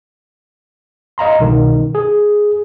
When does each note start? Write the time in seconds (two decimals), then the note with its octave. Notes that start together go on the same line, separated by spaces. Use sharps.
1.18 D#5 F5 A#5 C6
1.39 C2 B2 D#3
1.95 G#4